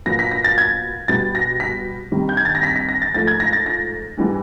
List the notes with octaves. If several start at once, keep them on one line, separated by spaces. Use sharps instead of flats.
A#2 F#3 B3 A#6
B6
A#6
A6
G#6
B2 G3 B3 A6
A#6
B6
C3 D#3 G3
G6
G#6
A6
A#6
B6
B6
A#6
A6
G#2 F3 A3 A6
G#6
A#6
A6
A#6
G#2 E3 G3 B3